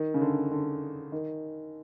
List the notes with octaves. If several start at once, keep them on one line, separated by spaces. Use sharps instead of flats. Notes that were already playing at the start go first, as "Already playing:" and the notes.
Already playing: D#3
C#3
D3
D3
D#3